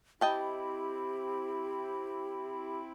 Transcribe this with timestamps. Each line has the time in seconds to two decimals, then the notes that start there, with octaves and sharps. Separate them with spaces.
0.21 C4 E4 G4 D#5 G5 A5